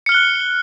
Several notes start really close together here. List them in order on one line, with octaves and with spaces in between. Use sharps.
C#7 F6 G7 F#6